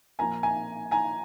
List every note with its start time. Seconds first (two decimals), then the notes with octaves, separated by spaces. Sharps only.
0.19 A#2 F3 A#3 G#5 A#5
0.43 G#5 A#5
0.91 G#5 A#5